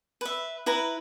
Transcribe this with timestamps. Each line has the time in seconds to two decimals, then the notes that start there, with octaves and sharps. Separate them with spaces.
0.21 B4 E5
0.66 E4 B4 A#5